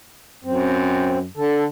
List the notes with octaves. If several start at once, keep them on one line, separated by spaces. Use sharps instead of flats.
F#2 C4
D3 A4